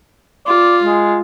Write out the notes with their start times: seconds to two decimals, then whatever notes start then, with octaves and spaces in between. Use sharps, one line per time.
0.46 F4 D5
0.84 G#3